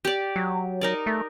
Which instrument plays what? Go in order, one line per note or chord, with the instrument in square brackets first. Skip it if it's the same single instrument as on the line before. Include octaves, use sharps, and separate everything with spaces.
[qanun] G4 D5
[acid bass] F#3
[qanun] D#4 A#4 D5
[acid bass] A3